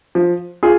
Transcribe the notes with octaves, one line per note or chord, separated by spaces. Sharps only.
F3
F4 G#4